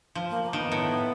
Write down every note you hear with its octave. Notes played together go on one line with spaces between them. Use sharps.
F3
A#3
A#3
D#3 B3
A2